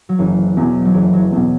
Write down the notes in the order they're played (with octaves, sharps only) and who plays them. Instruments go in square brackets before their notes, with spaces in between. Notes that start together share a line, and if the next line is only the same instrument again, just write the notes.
[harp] F#3
[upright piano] F#1 [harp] E3
[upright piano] E2 B2 [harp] F#3
[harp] F#3
[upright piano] F#1 [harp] E3
[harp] F#3
[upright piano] E2 B2 [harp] F#3